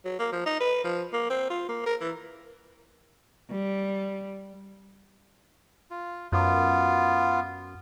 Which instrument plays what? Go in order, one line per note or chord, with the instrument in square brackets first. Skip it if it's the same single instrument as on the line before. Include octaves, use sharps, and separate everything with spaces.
[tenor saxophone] F#3
A#3
F3
D#4
B4
F3
A#3
C4
F4
A#3
A#4
E3
[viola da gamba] G3
[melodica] F4
[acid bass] F#2 [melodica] B3 F4